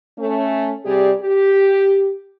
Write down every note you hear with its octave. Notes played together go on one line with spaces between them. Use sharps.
A3 C#4
C3 G3 G4 G#4 D5
G4